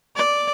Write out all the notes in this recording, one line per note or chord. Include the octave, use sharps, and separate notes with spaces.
D5